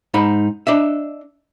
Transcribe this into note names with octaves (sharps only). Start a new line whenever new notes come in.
G#2 D#4 B5
D4 D#5 E5